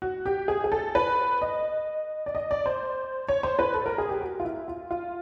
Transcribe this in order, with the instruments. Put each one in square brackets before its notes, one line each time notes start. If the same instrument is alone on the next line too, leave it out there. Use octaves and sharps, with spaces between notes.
[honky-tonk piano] F#4
G4
G#4
G#4
A4
B4
D#5
D5
D#5
D5
C5
C#5
C5
B4
A4
A#4
G#4
G4
F#4
F4
E4
F4
F4